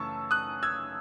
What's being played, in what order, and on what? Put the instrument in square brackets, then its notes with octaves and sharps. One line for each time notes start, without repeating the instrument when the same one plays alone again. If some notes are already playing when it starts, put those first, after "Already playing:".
Already playing: [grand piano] F#2 C#3 E3 A3 A5 C#6 E6
D#6 F#6
E6 G#6